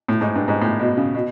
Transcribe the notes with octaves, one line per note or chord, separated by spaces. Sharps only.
A2
G#2
G2
G#2
A2
B2
C#3
B2